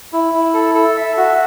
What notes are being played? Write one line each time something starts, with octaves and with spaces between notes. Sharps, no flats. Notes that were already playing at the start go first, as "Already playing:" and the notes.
E4
E4
A4
A4
E5
F#4